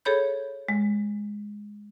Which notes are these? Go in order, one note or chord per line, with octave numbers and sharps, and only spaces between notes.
G#4 A4 C#5 B5 G6
G#3